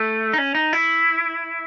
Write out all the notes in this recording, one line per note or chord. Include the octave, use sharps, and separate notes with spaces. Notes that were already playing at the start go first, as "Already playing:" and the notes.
Already playing: A3
D#4
C#4
D#4
E4